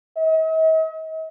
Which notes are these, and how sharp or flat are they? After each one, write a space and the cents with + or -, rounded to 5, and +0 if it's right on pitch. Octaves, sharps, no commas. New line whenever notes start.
D#5 +45